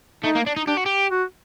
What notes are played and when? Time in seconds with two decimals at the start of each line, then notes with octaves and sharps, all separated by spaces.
0.24 A3 D#4
0.36 A#3
0.47 D4
0.56 D#4
0.67 D4 G4
0.77 F#4
0.86 G4
1.10 F#4